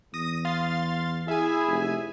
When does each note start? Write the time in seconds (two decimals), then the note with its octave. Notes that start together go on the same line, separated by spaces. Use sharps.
0.14 E2 D#6 A#6
0.45 F5 C6 A6
1.28 E4 G#4 E5 G#5
1.68 F1